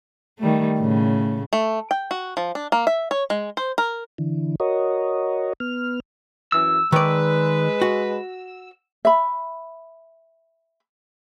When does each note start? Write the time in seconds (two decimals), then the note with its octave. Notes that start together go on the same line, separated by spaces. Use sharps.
0.39 D#3 G3 A3
0.78 A2 C#3
1.53 A3
1.91 G5
2.11 F#4
2.37 F3
2.55 D4
2.72 A#3
2.87 E5
3.11 C#5
3.30 G#3
3.57 C5
3.78 A#4
4.18 D3 E3
4.60 F#4 A#4 C#5 D#5
5.60 B3 F6
6.52 F#2 E3 E6
6.92 D#3 G#3 B4 D5
7.82 F#4
9.05 E5 B5